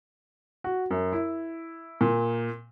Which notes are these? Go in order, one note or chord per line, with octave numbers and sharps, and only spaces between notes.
F#4
F#2
E4
A#2